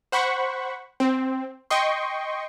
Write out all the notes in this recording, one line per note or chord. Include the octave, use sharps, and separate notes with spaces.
C5 F#5 B5 C#6
C4
D#5 G5 C6 C#6